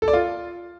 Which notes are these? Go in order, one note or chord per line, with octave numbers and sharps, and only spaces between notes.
A4
D5
F4